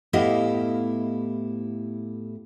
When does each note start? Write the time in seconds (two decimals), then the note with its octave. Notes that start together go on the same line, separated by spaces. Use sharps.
0.13 A2 B3 E4 G4 D#5 F5